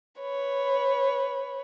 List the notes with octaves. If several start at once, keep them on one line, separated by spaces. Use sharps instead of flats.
B4 C#5 B5